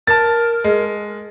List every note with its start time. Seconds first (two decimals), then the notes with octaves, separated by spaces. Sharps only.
0.07 A#4 A5 A6
0.64 G#3